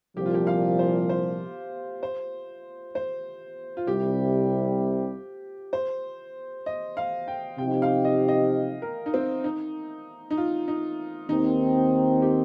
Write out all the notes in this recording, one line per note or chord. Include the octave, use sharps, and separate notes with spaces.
C2 A#2 F3 G4
F4
G4
F5
C5
C5
C5
C5
F4
C2 C3 G3 G4
C5
D#5
F5
G5
C3 F3 D#4 G4 G5
F5
D#5
D#5
A#4
D#4
C4
D#4
D#4
F4
D#4
D#2 D#3 C4 D#4
G4